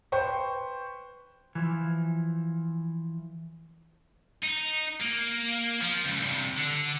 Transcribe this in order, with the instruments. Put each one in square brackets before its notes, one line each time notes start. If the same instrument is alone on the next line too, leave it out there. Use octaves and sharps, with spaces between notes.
[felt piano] B4 C5 G5 C#6
[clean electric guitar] E3 F3
[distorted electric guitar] D#4
A#3
F3
C#2
G2 C3
D3